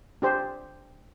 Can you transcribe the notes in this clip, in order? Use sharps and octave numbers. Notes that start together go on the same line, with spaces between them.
D4 G4 C5